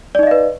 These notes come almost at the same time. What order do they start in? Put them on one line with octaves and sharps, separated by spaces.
D5 D#4 D#5 F5 B4